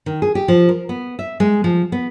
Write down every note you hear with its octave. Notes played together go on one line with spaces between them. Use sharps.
D#3
G#4
G4
F3
A#4
B3
E5
G#3
F3
B3